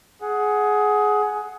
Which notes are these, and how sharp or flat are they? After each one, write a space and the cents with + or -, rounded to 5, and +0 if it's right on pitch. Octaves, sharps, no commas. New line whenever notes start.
G#4 +15 F#5 +0